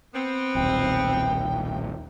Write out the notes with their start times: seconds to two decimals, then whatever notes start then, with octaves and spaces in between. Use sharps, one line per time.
0.14 B3 C4
0.55 D#1 B1 G5